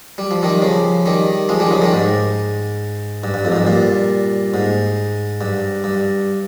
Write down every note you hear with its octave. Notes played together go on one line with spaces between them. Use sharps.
G3
F3
D#3 G3
C#3 F3
D#3 G3
F3 G#3
D#3 G3
C#3 F3
D#3 G3
G#2
G2
G2
F2
G#2
G2
G2 A#2
G#2
G2
G2